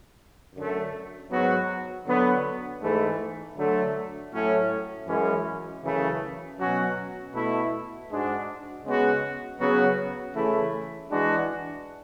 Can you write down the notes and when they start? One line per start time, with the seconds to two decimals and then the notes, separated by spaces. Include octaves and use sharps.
0.55 F#2 D3 A3
1.31 G#2 F#3 B3 F#4
2.06 D3 F#3 B3
2.82 G#2 E3 A3
3.57 D3 F#3 A3
4.32 A2 F#3 A3 C#4
5.07 F#2 E3 G#3 C#4
5.83 F#2 C#3 E3 A3
6.59 B2 F#3 C#4 F#4
7.34 B2 A3 E4
8.10 G#2 G#3 D4 F#4
8.85 C#3 G#3 B3 F#4
9.60 C#3 F#3 B3 F#4
10.36 C#3 E3 A3 E4
11.11 E3 G#3 D4 F#4